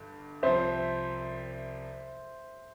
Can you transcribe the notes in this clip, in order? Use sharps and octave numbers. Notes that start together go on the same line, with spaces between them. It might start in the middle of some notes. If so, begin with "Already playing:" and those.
Already playing: G1 G2 D3
C2 C3 F3 C5 E5